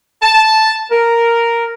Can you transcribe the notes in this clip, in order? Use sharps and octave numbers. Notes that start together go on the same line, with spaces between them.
A5
A#4